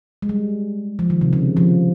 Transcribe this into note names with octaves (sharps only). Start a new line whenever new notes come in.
G#3
G3
F3
D#3
C3
C#3
F3